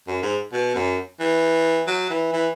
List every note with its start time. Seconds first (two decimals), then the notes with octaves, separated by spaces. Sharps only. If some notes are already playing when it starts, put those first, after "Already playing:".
0.08 F#2
0.23 G#2
0.53 B2
0.75 F#2
1.20 E3
1.88 F#3
2.10 E3
2.33 E3